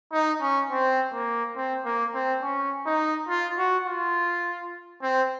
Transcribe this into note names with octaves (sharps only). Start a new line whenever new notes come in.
D#4
C#4
C4
A#3
C4
A#3
C4
C#4
D#4
F4
F#4
F4
C4